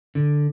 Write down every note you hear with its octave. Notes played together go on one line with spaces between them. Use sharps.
D3